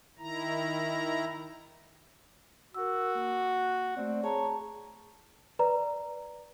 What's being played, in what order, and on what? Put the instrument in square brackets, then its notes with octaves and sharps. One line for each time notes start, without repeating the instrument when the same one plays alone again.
[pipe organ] D#3 E4 A#5
[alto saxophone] F#4 [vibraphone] A#4 E6
[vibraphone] A#3
[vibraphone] A3 D5 [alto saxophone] C4
[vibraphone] G#4 A5 A#5 [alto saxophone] C#5
[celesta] B4 D5 A#5